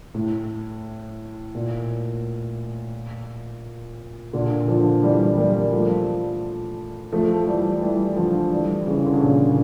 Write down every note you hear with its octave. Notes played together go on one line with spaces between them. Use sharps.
A2
A#2
A#2 D3
D3 F3
E3 G3
G3 A#3
F3 A3
F3 A3
E3 G3
E3 G3
D3 F3
E3 G3
C#3 E3
E3
D3
C#3
A#2